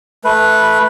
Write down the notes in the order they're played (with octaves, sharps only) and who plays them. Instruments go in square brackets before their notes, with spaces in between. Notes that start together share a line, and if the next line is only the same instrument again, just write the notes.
[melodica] A3 B4